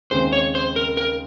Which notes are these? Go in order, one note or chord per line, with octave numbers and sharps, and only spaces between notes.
D#2 C#3 G#3 C4 C5
C#5
C5
A#4
A#4